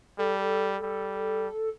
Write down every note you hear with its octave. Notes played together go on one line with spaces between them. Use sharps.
G3 A4
G3